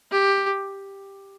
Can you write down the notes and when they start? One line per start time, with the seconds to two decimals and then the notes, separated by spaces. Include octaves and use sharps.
0.11 G4